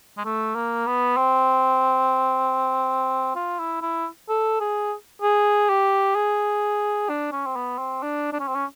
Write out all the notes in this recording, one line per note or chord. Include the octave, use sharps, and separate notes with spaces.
G#3
A3
A#3
B3
C4
F4
E4
E4
A4
G#4
G#4
G4
G#4
D4
C#4
C4
B3
C4
D4
D4
C#4
C4
C#4